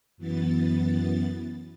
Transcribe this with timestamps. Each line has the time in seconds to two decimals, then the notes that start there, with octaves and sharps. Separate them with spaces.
0.17 F#2 E3 B3 A6